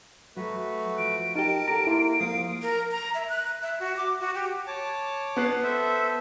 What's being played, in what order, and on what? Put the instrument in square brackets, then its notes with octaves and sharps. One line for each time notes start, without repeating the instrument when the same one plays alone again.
[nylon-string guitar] F#3 [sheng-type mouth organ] A3 F#4 B4
[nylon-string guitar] F3 [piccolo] D7
[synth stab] D#4 G4 [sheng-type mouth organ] A#4 A5
[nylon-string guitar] G4 A4 F#5 [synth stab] A#5
[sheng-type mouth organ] A#3 F4 [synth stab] E4
[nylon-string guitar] F3 A#3 [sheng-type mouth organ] F5 D#6
[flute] A#4
A#5
E5
F#6
E5
F#4
D6
F#4
G4
[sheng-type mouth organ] C#5 A5 D6
[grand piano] B3 F#6 C7
[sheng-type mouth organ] A4 C5 E5